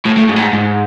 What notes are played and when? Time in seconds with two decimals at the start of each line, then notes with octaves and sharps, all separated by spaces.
0.06 A2
0.18 A2
0.29 G#2
0.36 A2
0.41 G#2
0.53 G#2